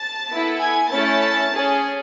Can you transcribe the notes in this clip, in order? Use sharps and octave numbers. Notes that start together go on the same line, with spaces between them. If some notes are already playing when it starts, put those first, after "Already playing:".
Already playing: A5 A6
B3 E4 A4
G#5 G#6
A3 C#4 E4 A4 A5 A6
C#4 G#4